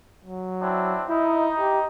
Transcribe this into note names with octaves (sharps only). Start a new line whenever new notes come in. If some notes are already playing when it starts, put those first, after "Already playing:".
F#3
C4 D4 E4
D#4 E4
G4